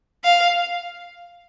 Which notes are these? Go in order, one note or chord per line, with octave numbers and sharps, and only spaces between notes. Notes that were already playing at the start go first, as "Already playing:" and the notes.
F5